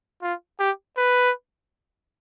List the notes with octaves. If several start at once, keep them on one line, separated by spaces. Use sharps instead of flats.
F4
G4
B4